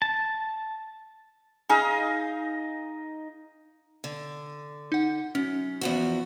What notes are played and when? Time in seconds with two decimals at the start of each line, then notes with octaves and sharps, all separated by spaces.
0.02 A5
1.69 D#4 G#4 D#5 F5
4.04 D3
4.92 D#4 F#5
5.35 F#2 C#4
5.81 E2 F3 F#4